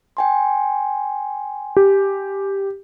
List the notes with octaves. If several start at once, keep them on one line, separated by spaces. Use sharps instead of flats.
G5 G#5 C6
G4